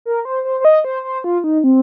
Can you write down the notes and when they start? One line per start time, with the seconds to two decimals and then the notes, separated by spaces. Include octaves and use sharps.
0.05 A#4
0.25 C5
0.45 C5
0.60 C5
0.65 D#5
0.84 C5
1.04 C5
1.24 F4
1.44 D#4
1.64 C4